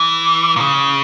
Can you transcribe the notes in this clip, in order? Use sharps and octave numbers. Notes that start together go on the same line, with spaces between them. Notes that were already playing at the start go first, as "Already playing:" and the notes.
Already playing: E3
A#2
C#3